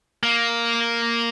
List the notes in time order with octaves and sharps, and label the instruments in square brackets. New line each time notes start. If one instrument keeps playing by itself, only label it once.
[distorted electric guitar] A#3